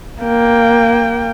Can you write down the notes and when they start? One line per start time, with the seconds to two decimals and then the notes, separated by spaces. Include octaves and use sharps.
0.22 A#3 G5